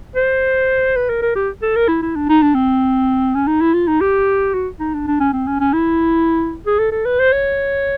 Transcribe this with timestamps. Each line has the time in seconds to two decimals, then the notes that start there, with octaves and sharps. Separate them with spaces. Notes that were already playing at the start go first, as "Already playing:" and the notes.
0.16 C5
0.96 B4
1.09 A#4
1.22 A#4
1.36 G4
1.62 A4
1.76 A#4
1.88 E4
2.02 E4
2.16 D4
2.29 D#4
2.42 D4
2.55 C4
3.35 C#4
3.47 D#4
3.61 E4
3.74 F4
3.88 D#4
4.01 G4
4.54 F#4
4.80 D#4
4.94 D4
5.07 D4
5.20 C#4
5.33 C4
5.47 C#4
5.60 C#4
5.73 E4
6.66 G#4
6.79 A4
6.92 A4
7.05 B4
7.19 C5
7.32 C#5